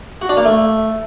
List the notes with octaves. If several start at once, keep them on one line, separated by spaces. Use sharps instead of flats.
F#4
D4
A#3
A3